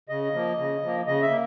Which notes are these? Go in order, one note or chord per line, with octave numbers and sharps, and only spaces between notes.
C#3 D#5
F3 A#3
C#3
F3 A#3
C#3 D#5
E5
A#3